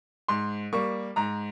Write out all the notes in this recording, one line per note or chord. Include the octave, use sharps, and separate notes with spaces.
G#2 C6
G3 A#3 C#6
G#2 A#5